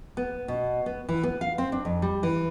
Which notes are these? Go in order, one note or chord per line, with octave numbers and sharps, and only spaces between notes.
B3
B2
B3
E3
B3
F5
C4
D4
F2
G3
E3